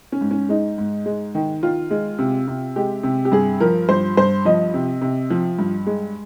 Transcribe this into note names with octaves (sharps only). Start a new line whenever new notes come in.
C#4
G#2
C#4
G#3 D#4
G#2
G#3
D#3
D#3 F4
G#3
C3
C3
G#3 G4
C3
G4
G2 G#4
F3 A#4
G2 C5
G2 C5
F3 D#5
C3
C3
F3
G2
G#3